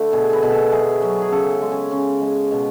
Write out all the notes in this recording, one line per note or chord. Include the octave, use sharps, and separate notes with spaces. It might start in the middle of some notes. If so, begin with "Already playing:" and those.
Already playing: D3 A3 B4
B2 G#4
B4
B2
A4
A3 G#4
F#3
G#4
C#3 A4
G#3
C#4
C#3 C#4
G#3
B2